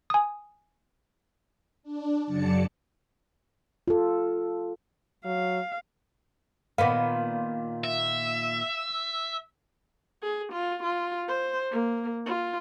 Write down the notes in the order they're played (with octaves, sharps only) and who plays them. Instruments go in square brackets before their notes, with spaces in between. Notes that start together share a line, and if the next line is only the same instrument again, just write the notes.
[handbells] G#5 D#6
[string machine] D4
F#2 C#3 F#3 D5 A5 C#7
[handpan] F4 A4
[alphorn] F#3 [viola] F5
[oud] A#2 D#3 B3 [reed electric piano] F5
[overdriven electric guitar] E5
[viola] G#4
F4
F4
C5
A#3
F4